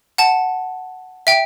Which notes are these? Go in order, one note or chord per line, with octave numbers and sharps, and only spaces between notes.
F#5 A5
E5 G5